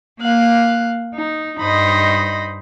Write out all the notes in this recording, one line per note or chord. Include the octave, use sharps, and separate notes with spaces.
A#3 F5 F#6
D#4
G2 D#4 C5 D#5 B5 A#6